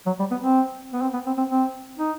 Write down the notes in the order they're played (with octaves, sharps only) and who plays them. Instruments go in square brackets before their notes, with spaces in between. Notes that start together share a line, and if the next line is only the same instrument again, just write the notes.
[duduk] F#3
G3
B3
C4
B3
C4
B3
C4
C4
C4
D#4